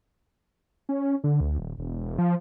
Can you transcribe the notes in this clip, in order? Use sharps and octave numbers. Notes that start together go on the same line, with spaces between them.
C#4
D3
D2
D#1
E1
F3